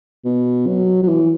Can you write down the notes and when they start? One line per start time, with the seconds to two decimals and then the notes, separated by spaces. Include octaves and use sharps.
0.25 B2
0.67 F#3
1.03 F#3
1.08 E3